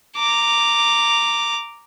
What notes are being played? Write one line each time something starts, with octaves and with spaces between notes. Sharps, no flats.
A#5 D6